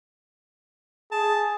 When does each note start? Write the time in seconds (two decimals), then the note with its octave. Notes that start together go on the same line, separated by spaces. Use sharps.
1.12 G#4 A5